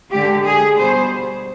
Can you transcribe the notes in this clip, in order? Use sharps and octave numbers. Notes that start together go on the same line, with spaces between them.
D3 G#3 G4
G#4
B2 G3 C5